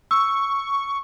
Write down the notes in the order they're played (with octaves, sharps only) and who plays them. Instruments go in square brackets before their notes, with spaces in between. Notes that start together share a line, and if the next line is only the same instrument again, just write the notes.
[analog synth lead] C#6 [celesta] E6